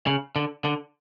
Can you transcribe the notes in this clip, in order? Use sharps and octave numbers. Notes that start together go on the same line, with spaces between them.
C#3
D3
D3